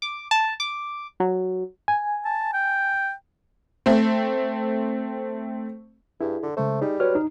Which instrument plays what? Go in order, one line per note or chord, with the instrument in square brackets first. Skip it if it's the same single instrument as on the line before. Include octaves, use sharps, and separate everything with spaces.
[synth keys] D6
A5
D6
F#3
[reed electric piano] G#5
[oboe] A5
G5
[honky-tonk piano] A3 C4
[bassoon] G2 [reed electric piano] E4 G#4
[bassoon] D3
[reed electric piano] C#3 G#3 C5 [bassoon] A3
[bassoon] G3 [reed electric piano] D#4 G#4
[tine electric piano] F#4 B4 C#5 [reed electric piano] F6
[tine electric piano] D#4